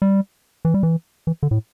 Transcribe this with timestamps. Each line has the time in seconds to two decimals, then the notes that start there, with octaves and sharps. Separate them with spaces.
0.02 G3
0.65 E3
0.74 G3
0.83 E3
1.27 E3
1.43 D3
1.51 A2